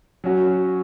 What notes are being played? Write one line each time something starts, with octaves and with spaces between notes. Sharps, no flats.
F#3 C#4 F#4 C#5